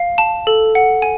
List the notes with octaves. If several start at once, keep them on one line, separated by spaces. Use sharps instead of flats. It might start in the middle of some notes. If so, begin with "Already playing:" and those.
Already playing: F5
A5
A4
F#5
G#5